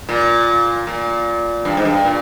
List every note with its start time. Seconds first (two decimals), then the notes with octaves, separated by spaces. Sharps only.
0.09 A#2
0.87 A#2
1.65 G2
1.77 G#2
1.85 G2
2.05 A#2